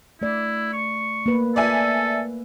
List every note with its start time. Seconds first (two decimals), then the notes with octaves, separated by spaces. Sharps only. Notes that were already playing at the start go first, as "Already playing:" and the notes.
0.22 A3 E4 D5
0.73 C#6
1.26 A#3 B4
1.56 A4 D5 E5 G#5